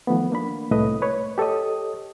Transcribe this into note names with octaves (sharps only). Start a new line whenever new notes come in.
D#3 F3 A3 B3
A#3 D4 B5
C2 A2 A3 B4 D#5 D#6
B4 C#5
G4 A4 C#5 D#5 D#6